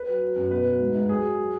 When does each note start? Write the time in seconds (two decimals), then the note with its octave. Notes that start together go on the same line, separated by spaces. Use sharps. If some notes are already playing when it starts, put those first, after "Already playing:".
Already playing: B4
0.08 F#3
0.22 F#3
0.36 F#2
0.51 B2 B4
0.66 F#3
0.80 G#2
0.95 G#2
1.09 F#3 G#4
1.24 F#3
1.38 F#3